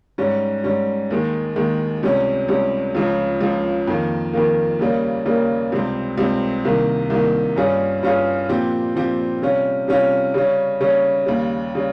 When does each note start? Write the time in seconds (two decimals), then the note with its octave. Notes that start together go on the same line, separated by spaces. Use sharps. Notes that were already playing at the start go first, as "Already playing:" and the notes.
0.18 G#2 G3 C#4
0.64 G#2 G3 C#4
1.10 D#2 D#3 G#3
1.56 D#2 D#3 G#3
2.03 C#2 C3 G3 C#4
2.48 C#2 C3 G3 C#4
2.95 C#2 C#3 F3
3.41 C#2 C#3 F3
3.87 F2 D#3 A#3
4.33 F2 D#3 A#3
4.79 D#2 C#3 G3 A#3
5.26 D#2 C#3 G3 A#3
5.72 C#2 C3 G3 C4
6.18 C#2 C3 G3 C4
6.65 C2 C3 D#3 A#3
7.10 C2 C3 D#3 A#3
7.56 G2 G3 C#4 F4 G#4
8.03 G2 G3 C#4 F4 G#4
8.49 A#2 F3 C4 G4
8.95 A#2 F3 C4 G4
9.42 C3 G3 C#4 F4
9.88 C3 G3 C#4 F4
10.34 C#3 G3 C#4
10.81 C#3 G3 C#4
11.26 D#2 C#3 G3
11.75 C#3 G3